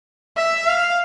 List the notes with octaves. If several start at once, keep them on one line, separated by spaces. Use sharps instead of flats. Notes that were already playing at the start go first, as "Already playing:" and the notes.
E5
F5